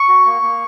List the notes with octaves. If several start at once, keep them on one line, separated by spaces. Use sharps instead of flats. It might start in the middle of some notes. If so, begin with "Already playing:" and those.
Already playing: C#6
F#4
A#3
A#3